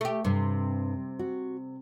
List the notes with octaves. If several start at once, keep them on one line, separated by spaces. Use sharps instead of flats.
A3 G4
G2 C3
F#4